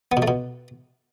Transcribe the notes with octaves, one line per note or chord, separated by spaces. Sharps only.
B3
B2
A3
B2